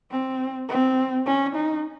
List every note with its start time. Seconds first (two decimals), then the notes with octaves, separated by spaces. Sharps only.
0.11 C4
0.69 C4
1.26 C#4
1.55 D#4